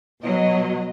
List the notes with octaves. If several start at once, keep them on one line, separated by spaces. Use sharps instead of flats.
B2 F#3 D#5